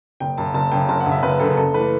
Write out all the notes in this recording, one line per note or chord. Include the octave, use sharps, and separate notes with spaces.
F#1 G5
F#2 C#3 A5
F#1 A5
F#2 C#3 G5
F#1 A5
F#5
F#2 C#3
E5
F#1 B4
F#2 C#3 A4
F#1 A4
E3 A3 B4